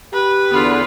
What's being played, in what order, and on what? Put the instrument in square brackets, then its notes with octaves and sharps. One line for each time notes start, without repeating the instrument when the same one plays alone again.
[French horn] G4 [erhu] B4
[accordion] E2 D3 [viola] B3 F4